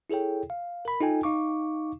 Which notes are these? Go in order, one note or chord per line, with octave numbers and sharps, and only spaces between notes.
E4 G#4 A4 C#5 G5
F5
A#4 B5
D#4 F4 A4 G5 G#5
D#4 F5 C#6 D6